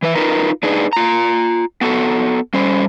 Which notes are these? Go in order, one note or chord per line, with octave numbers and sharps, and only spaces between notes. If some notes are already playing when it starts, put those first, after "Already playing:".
E3 B4 E5
D#4 F4 A#4 B4
D4 D#4 G#4 B4
F4 A#5
B3 F#4 A4
G3 C#4 C5